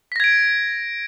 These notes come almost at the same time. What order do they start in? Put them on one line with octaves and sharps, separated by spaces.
B6 A#6 G#6 D7